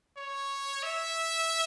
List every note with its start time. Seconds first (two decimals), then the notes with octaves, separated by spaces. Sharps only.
0.17 C#5
0.83 E5